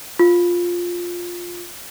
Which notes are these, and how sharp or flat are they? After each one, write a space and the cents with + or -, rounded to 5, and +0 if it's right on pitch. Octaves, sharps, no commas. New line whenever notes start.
F4 +5